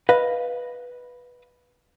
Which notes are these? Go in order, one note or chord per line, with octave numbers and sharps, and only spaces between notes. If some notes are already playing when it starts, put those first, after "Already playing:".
B4 D#5 F5